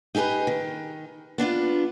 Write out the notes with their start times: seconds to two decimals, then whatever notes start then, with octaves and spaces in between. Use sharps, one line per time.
0.15 D#4 G4 G#4 A#4 B4
0.47 D#3
1.38 B3 D4 D#4 F4